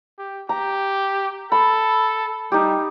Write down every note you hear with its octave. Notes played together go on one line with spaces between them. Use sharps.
G4
G4 A#5
A4 B5
G3 D#4 G4